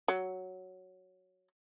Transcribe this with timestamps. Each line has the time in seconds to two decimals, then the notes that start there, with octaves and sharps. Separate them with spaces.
0.08 F#3